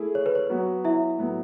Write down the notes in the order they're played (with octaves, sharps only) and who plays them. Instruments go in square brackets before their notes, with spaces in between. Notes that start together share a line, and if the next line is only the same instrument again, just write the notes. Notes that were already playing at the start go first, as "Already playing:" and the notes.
Already playing: [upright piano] A3 E4 G#4
[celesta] C#5
B4
C#5
[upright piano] F#3 B3 F#4 B4
[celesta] E4 E5
[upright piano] A2 F#3 B3